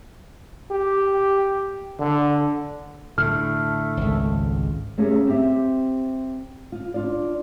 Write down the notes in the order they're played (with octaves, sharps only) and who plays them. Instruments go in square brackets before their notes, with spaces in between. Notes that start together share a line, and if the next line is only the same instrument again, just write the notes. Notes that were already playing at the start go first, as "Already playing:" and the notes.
[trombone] G4
D3
[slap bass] A2 D3 [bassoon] A3 [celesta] F6
[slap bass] G#1 C#2
[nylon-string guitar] A3 A#3 C#4 G4 G#4
C4 G4 E5
F4
D4 F4 D5